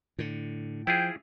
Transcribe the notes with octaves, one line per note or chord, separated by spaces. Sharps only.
A2 D3
F3 E4 F4 G#4 G5